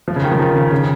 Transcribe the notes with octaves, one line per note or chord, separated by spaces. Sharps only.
F3
C#3
D#3
F3
D#3
C#3
C#3